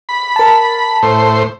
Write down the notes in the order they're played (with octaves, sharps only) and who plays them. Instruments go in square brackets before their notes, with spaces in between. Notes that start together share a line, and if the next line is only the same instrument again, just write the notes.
[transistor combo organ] B5
[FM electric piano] A#4 A5
[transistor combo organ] A2 C5